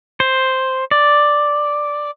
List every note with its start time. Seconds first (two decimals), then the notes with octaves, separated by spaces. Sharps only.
0.20 C5
0.91 D5